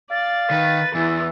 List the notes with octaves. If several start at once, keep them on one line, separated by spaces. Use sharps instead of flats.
D5 F5 A6
D#3 B4
E2 E3